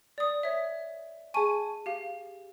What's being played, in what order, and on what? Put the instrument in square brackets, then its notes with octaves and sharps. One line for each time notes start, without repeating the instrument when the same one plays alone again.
[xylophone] D5 D#6
C#5 E5
[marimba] G#4 A5 C#6 [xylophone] G#5 D#7
[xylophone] G4 F5